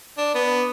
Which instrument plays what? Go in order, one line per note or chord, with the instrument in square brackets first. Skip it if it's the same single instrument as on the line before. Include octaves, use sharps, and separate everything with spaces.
[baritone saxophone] D4
B3